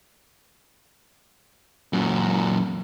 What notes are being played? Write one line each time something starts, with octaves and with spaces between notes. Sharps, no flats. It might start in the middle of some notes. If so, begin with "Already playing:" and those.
F#2 A#2